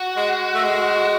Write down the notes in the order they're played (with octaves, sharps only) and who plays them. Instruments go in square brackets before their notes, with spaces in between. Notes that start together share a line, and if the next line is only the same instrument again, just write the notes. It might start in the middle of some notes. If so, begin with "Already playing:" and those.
Already playing: [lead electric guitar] F#4
[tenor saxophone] G#3
A3
G#3